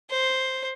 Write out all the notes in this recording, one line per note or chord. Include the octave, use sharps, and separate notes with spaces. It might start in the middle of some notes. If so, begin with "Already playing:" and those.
C5